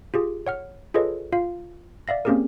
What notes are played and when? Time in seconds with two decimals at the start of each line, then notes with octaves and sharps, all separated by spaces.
0.14 F4 G4 G#4
0.47 C#5 F#5 F6
0.94 F4 G#4 A4 B4 C#5 D#5
1.32 F4 F5
2.08 D5 E5 F5 A#6
2.25 A#3 C4 C#4 G4 G#4 A#4